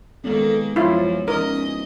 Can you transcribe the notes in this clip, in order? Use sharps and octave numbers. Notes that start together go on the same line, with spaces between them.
D#3 G#3 A#3 B3 C#4 A4
F#2 F3 E4 F4
E2 F3 C#4 D#4 A#4 D#5